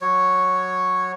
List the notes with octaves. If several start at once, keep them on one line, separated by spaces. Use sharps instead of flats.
F#3 C#5